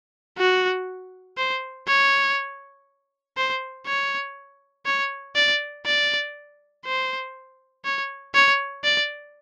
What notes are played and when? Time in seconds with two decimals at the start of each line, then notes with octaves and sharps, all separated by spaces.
0.38 F#4
1.38 C5
1.87 C#5
3.37 C5
3.86 C#5
4.86 C#5
5.35 D5
5.86 D5
6.85 C5
7.85 C#5
8.35 C#5
8.84 D5